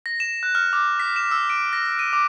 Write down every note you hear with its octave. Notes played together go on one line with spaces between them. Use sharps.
A#6
E7
F#6
F6
D6
B6
E7
E6
D7
A#6
D#7
D6